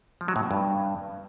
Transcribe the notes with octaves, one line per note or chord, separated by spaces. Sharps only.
F3
F#3
A2
B2
G2